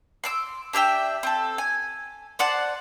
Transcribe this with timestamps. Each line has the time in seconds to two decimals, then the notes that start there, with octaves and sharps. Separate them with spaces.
0.24 C6 D6 E6
0.73 D4 G4 E5 G5
1.23 C4 A4
1.58 G#5
2.39 C5 D5 F#5 A5